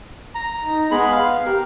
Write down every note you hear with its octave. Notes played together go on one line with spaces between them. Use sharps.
A#5
D#4
G#3 B3 G#4 B5
F5
G4 A#4